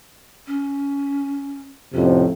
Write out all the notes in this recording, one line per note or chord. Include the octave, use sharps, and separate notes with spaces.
C#4
F2 A2 C3 C#4